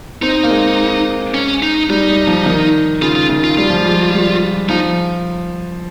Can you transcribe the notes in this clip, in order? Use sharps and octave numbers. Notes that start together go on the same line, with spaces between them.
C4 D#4
A#3
G#3
C#4
D#4
G3 D#4
G3
F3
D#3
C#3 F4
F4
D#3
F4
G3 F4
F3
G3
G#3
G3
F3 D#4